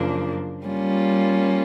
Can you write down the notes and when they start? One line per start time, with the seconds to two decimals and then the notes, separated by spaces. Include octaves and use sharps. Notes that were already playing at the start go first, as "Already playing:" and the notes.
Already playing: F#2 C#3 F3 A#3 D4
0.65 G3 A#3 C#4 F4